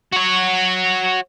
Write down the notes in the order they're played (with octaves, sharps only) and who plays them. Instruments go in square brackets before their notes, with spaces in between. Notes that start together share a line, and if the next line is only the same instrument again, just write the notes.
[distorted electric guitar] F#4 C#5